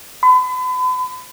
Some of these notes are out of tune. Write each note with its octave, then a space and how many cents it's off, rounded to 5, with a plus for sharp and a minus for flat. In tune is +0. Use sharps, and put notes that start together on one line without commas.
B5 +40